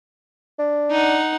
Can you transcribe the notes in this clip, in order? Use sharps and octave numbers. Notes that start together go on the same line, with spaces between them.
D4
D#4 F#5